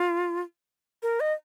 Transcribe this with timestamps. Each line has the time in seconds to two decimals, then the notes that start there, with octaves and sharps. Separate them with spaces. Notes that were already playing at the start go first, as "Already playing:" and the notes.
Already playing: F4
1.03 A#4
1.20 D#5